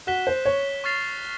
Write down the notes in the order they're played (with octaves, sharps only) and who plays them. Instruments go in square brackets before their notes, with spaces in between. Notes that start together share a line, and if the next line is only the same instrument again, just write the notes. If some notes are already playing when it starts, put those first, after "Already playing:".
[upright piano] F#4 [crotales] F#6 B6 E7 G7
[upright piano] C5
C#5
[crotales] C#6 F6 A6 C7 F7